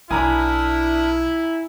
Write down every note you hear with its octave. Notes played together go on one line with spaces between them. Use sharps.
B1 D4 E4 A#4 G#5 A#5 B5 D#6